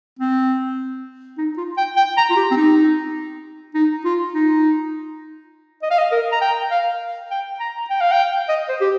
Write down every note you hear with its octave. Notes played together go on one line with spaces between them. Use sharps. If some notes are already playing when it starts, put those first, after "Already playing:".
C4
D#4
F4
G5
G5
A#5
F4
G4
C4
D#4
D#4
F4
D#4
D#5
F5
D#5
A#4
A#5
G5
F5
G5
A#5
G5
F5
G5
D#5
C5
G4